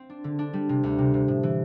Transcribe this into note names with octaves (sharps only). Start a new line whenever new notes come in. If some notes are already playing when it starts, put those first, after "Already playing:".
Already playing: C4
D4
D3
D4
G3
C3
D2
C3
C3
A2
E3